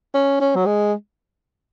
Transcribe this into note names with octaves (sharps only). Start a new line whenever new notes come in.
C#4
C#4
F#3
G#3